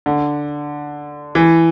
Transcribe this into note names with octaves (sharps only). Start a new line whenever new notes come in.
D3
E3